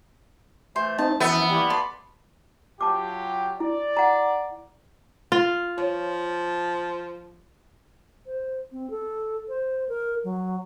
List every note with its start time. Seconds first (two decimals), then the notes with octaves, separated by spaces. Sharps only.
0.76 E3 A3 C5
0.98 C4 D#4 A5
1.20 F#2 E3 F3 B3 E5
1.48 G3 A#3
1.70 D5 A5 C6
2.81 F#3 F4 G4 A5 D6
3.60 E4 D5
3.97 F#5 A#5
5.32 F4
5.78 F3 C#5
8.26 C5
8.72 C4
8.90 A4
9.49 C5
9.89 A#4
10.24 F#3